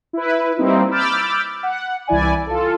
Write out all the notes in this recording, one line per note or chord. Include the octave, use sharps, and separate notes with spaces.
E4 B4
G3 A#3 C4 D#4 E4
B5 D6 E6 F6 G6 A6
F#5
C2 E3 E4 D5 G#5
F4 A4